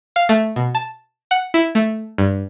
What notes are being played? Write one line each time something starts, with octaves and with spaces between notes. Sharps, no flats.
F5
A3
B2
A5
F#5
E4
A3
G2